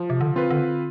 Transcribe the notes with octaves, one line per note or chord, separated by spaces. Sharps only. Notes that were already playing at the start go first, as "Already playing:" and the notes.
Already playing: F3
C3
D3
C4 F4 B4
D3